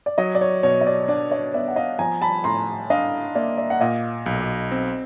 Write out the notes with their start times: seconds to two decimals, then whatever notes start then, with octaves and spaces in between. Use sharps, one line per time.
0.06 D5
0.18 F#3 C#5 D#5
0.35 D5
0.41 C#5
0.63 B2 C#5
0.81 D#5
0.87 D5
1.08 D4 D5
1.31 C#5 D#5
1.54 B3 D5 E5
1.68 F#5
1.76 D#5 F5
1.99 F3 G#5 A#5
2.22 A5 B5
2.44 A2 A#5 C6
2.90 D4 D#5 F5
3.35 A#3 D5 E5
3.57 D5 E5
3.70 F#5
3.80 A#2 D#5 F5
4.26 B1
4.71 C4